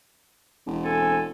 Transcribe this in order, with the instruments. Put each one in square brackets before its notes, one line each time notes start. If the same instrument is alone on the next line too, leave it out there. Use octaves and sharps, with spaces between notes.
[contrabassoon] E1
[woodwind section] C4 A4 G#5